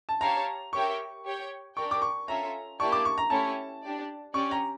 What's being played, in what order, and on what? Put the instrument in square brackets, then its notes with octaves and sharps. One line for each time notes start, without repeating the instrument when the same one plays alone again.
[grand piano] A5
[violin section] G4 C#5 F5 A5 [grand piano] A#5
[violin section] G4 A#4 C#5 E5 G5 [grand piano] C#6
[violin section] G4 C#5 G5
[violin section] D4 G4 A#4 D5 G5 [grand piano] C#6
[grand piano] D6
C#6
[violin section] C#4 F4 A4 E5 [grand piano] A#5
[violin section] A#3 E4 G4 D5 A5 [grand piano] C#6
[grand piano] D6
C#6
A#5
[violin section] A3 C#4 E4 G4 C#5 [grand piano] A5
[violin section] D4 G4 D5
[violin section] C#4 G4 D5 [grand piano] C#6
[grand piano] A#5